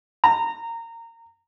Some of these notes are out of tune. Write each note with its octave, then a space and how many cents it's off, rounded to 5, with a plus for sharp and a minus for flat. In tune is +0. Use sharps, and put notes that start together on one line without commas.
A#5 -20